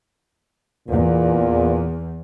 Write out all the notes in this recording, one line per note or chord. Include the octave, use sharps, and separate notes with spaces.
E2 A#2